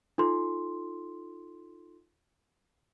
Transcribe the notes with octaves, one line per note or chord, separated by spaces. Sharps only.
D#4 F4 A4 C6